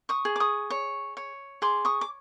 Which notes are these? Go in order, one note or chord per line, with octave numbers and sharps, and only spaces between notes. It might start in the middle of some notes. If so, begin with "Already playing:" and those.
C#6 D#6
G#4
D6
C#6 D#6
C#5
C#5
G#4 C6 D6
C#6 D#6
D6